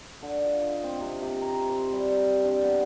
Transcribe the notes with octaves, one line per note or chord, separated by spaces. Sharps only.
D3
F4
D#5
C4
C3
C3
A#5
C6
G3
D4
B3